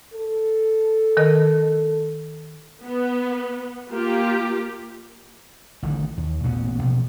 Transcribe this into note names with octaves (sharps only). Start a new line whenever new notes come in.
A4
D#3 A#4 D#5
B3
A#3 F4 G4
A1 D3 D#3
D#2
A1 A#2 C#3 B3
A1 B2 F3